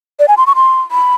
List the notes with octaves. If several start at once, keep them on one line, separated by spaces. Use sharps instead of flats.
D5
G#5
C6
C#6
C6
B5